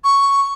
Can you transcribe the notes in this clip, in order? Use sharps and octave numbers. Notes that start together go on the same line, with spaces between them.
C#6